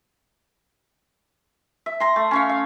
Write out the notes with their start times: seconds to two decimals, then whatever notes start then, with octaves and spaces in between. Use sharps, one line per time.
1.86 E5
2.00 A#5 C6
2.16 A3
2.31 C#4 C#5 F5
2.49 F5